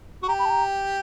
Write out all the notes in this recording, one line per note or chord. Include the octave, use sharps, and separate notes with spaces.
F#4
G4 A#5
B5
A5
A#5